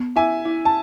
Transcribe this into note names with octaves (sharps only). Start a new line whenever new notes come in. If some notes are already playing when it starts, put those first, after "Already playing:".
Already playing: B3
E4 E5 G#5
E4
A5